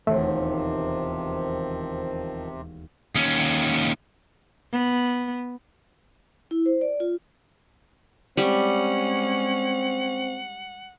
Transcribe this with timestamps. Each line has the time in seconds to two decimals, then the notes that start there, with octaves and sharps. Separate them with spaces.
0.07 E1 D#2 C3 D#3 F3 A3
3.15 D#2 C#4
4.72 B3
6.51 E4
6.66 C5
6.81 D5
7.00 F4
8.37 G3 G#3 C4 C#4 F#5